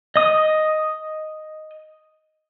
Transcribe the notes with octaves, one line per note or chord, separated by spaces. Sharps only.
D#5 D#6